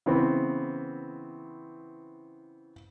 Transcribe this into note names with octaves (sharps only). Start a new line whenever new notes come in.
C#3 E3 B3 C4